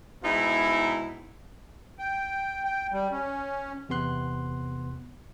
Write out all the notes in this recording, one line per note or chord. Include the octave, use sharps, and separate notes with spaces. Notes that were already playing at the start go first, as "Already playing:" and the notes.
G#2 B2 D#4 E4
G5
G5
G3
C#4
E2 C3 B3 C6 F#6